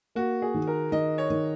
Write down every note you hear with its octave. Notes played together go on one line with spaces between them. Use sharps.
A#3 F#4
G#4
D#3
A#4
D#3 D#5
C#5
D#3